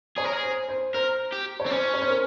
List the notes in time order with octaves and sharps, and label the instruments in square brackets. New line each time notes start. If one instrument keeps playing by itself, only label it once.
[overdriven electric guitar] G#4 [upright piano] C#5
[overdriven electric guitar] A#4
G#4
[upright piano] C5
C5
[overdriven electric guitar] A#4 [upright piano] C5
[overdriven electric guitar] G4
[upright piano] C#5
[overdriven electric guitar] C4
[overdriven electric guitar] C#4 [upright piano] C5
[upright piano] C#5
C5
A#4